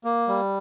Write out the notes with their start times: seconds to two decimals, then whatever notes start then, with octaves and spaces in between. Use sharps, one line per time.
0.04 A#3
0.28 G3